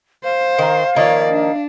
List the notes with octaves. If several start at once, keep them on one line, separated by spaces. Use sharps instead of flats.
C5 F5
D#3 A#4
D#3 F3 A#3 C#5 D5
D4